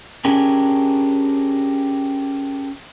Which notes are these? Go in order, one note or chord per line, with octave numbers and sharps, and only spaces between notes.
C#4 D4 G4 G#4 A#4